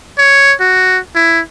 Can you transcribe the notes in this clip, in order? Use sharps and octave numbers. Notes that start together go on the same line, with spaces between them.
C#5
F#4
E4